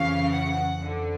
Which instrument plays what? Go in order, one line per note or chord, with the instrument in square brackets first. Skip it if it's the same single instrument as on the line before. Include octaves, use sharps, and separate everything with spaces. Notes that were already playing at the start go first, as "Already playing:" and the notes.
Already playing: [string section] F2 C#3 E3 F5
F#5
F2 D3